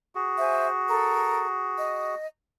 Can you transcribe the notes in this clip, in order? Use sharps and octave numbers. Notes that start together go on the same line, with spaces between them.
F#4 G#4
C5 E5 G#5
A4 A#4
D#5